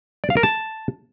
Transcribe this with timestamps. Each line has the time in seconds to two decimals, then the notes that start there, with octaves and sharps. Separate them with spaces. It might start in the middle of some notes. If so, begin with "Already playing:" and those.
0.24 D5
0.30 F5
0.37 A#4
0.43 A5